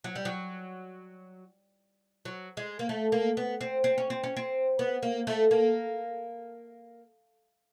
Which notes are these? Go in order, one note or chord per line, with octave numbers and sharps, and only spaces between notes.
F#3
G3
F#3
F#3
G#3
A#3
A3
A#3
B3
C4
C4
C#4
C4
C#4
C4
B3
A#3
A3
A#3